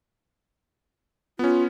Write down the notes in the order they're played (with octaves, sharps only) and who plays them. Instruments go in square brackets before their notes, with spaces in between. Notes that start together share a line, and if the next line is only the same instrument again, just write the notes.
[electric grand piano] B3 C#4 [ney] F4